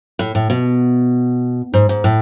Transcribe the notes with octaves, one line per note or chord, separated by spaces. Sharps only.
A2
A2
B2
G#2
G#2
A2